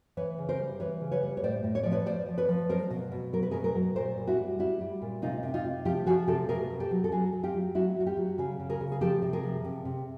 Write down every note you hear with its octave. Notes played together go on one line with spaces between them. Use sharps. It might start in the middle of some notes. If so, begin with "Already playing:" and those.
E3 B4 C#5
C#3
A#4 C5
G3
E3 B4 C#5
C#3
B4 C#5
G3
C#5
A2 C5 D5
A2
C#5
F3 D5
B4 C#5
F3 C5 D5
F3
B4 C#5
F3
F#3 A#4 C5
B2
B2
F#3 A#4
B4
B2 G#4 A#4
G#4 A#4
F#3
A#2 A#4 C5
G3
E4 F#4
G3
G3 E4 F#4
G3
A#2
C3 D#4 F4
C3
D#4 F4
C3
F3 F4 G4
F3 F#4 G#4
C3 G4 A4
B2 G#4 A#4
B2
G4 A4
F#3
A4
F#3 F#4 G#4
F#3
F4 G4
F#3
F#3 E4 F#4
F#3 F#4
F4 G4
F#3
C#3 F#4 G#4
C#3
G#4 A#4
C#3
G#4
F3 G4 A4
C3
G#4 A#4
F3
C3
C3